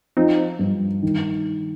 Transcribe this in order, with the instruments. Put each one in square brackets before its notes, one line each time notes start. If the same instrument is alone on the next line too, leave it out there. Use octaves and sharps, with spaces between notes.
[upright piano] F3 [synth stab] C4 D#4
[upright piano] G2
D#3